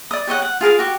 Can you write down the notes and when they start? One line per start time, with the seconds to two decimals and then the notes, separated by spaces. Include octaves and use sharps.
0.11 D5 D#6
0.27 G4 C#5 D#5 F#5
0.42 F#5
0.61 F4 G#4 A#4 F5
0.79 F#4 G4